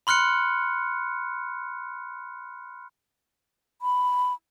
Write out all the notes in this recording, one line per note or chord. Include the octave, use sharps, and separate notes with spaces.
B5 C6 F6 F#6 C#7
B5